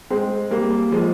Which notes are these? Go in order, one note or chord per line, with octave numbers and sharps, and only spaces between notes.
G#3 C4
G3 A#3
F3 G#3